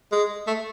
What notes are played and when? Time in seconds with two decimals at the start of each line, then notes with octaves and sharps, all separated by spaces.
0.12 G#3
0.47 A3